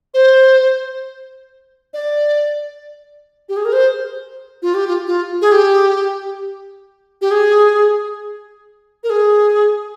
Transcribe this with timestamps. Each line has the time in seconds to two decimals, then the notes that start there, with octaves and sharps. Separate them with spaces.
0.14 C5
1.94 D5
3.49 G4
3.57 G#4
3.65 A#4
3.73 C5
4.62 F4
4.74 G4
4.88 F4
5.07 F4
5.42 G#4
5.52 G4
7.21 G4
7.31 G#4
9.04 A#4
9.10 G#4